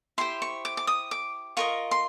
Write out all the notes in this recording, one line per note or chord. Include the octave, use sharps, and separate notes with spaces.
E4 G4 C5 C6
C#6
D6
D6
D#6
D6
F4 A#4 D#5 C#6
C6